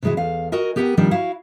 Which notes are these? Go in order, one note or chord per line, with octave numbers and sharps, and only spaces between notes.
C3 E3 G#3 E4 F#4
E2 A4 F5
F#4 A#4 D#5 G#5
B3 G4 A#4 F#5 G#5
D#3 F3 G3 C4 D4
E4 F#4 F5